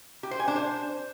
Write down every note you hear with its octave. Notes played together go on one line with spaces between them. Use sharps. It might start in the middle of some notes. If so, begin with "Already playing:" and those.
G4
C5
G#5
D4
C5